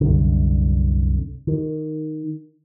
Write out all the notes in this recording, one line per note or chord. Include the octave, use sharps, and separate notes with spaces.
C2 F#2 D3
D#3